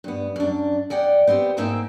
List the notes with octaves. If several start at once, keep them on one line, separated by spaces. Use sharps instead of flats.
G2 B3
F#2 D4
E2 D5 F#5 G5
B3 C4 G4 C5
G#2 A#3 C4 D#4 E5